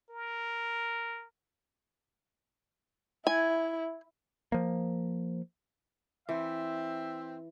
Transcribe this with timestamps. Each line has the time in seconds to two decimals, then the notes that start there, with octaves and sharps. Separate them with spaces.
0.10 A#4
3.27 E4 G#5
4.52 F3 A#3
6.29 E3 C4 E5